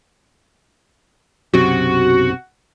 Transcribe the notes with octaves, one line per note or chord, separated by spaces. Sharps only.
B1 F#2 C3 F#4